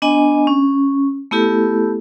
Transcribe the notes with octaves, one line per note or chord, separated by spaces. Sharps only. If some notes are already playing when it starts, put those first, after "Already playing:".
B3 D4 D#5 G#5
C#4
A3 B3 E4 G4 A4